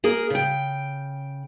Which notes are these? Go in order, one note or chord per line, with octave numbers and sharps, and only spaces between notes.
A#3 G#4 A#4
C#3 G5